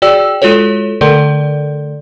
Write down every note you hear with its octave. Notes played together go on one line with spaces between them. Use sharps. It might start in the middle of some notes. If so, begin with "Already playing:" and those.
F#4 G#4 D5 G5 E6
G#3 F4 F#4 A4 C#5
D3 A3 A4 A#4 D5